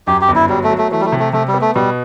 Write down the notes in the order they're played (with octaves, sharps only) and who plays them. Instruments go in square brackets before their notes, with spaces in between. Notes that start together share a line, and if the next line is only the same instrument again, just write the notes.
[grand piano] F#2 [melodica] G4
[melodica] G4
[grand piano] G1
[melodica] E4
[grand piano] F#3 [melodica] G3
[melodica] A3
[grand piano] F#3
[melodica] A3
[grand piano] E3 [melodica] A3
[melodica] G3
A3
[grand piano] C3
[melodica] A3
[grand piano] C3 [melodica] A3
[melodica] G3
[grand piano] B3
[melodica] A3
[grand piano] B2 [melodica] G3